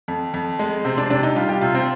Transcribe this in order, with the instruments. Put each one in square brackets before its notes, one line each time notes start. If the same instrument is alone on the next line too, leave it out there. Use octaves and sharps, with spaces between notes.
[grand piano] F2
F2
G#3
C3 C4
D4
C3 D4
D#4
G3 F4
G4
C3 F4
C4